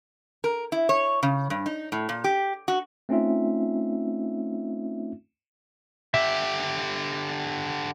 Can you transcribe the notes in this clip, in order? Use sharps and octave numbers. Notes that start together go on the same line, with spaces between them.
A#4
E4
C#5
C#3
G2
D#4
A2
A#2
G4
F#4
A3 C4 C#4 D#4 F4 E5
D3 G4 E5